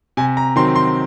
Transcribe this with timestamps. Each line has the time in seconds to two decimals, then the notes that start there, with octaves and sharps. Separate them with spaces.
0.17 C3 G#5
0.37 A#5
0.56 D#3 F#3 C4 C6
0.75 C6